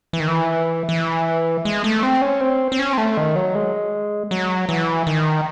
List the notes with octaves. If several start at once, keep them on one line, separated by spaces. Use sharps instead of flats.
E3
D#3
E3
E3
G#3
A3
C4
C#4
C4
C4
C#4
C4
A3
D#3
F#3
G#3
F#3
E3
D#3